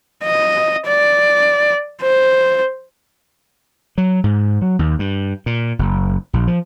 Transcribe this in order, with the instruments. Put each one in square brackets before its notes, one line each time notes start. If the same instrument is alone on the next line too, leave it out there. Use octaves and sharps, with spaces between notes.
[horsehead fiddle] D#5
D5
C5
[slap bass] F#3
G#2
F#3
D#2
G2
A#2
F#1
A#1
F3